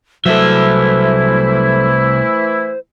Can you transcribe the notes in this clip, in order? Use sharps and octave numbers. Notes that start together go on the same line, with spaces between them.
C2 E3 F#3 A3 E4 A4 C5 E5